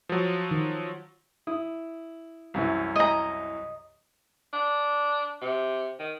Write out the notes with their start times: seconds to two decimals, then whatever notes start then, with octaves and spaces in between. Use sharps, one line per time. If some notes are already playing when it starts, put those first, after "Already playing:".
0.09 F3 F#3
0.51 D#3
1.47 E4 D#6
2.54 C2 F#2 E3
2.96 D#5 A#5
4.53 D4
5.41 C3
5.99 D#3